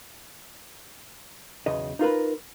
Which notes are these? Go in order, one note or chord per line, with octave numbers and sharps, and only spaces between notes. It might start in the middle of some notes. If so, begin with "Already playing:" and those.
B1 E2 C#3 D#5
D#4 F4 A#4 B4